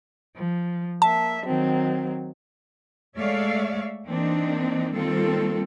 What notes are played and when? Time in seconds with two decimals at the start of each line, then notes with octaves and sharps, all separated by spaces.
0.35 F3
1.02 A#3 E5 A5
1.45 D#3 F#3 C4
3.16 G#3 A3 C#5 D5 E5 F5
4.06 E3 A#3 C4 D4 D#4
4.93 D#3 G3 A#3 C4 F4 A4